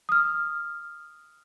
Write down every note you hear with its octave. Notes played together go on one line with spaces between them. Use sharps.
D#6 F6